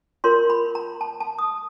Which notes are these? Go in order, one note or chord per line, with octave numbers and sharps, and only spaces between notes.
F4 A#4 C#5 C6
B5
A#5
A5
A5
D#6